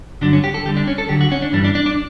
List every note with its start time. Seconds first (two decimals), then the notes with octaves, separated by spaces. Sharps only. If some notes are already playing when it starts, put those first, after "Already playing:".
0.21 G2 D3 F#3 D4
0.33 C#4
0.44 G4
0.54 A4
0.65 E2 D3 G3 G4
0.77 D4
0.87 C#4
0.98 A4
1.09 D2 D3 F#3 G4
1.21 F#4
1.32 C#4
1.42 D4
1.53 G2 E3 G3 D4
1.64 D4
1.75 D4
1.86 D4